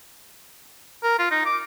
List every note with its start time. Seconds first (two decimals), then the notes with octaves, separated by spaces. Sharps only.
1.03 A#4
1.19 F4
1.31 D#4
1.46 D6